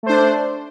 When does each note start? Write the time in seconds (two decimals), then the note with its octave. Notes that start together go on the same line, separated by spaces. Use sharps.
0.03 A3
0.06 C5
0.09 D4